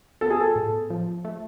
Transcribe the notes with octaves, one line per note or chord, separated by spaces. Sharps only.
B3 A4
G#4
A4
A2
F3
A3